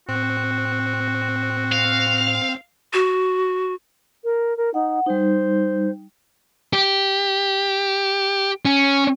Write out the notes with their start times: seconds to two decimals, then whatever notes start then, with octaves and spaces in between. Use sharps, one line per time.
0.09 A2 C4 F#4
1.72 F5
2.93 F#4
4.24 A#4
4.57 A#4
4.74 D#4 F#5
5.06 G3 D#4 C5
6.73 G4
8.65 C#4